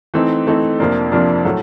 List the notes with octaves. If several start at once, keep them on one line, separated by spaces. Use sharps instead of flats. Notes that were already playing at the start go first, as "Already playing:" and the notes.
E3 A3 C4 D#4
E3 A3 C4 D#4
F2 C3 F3 A#3 D4
F2 C3 F3 A#3 D4
A2 F#3 A3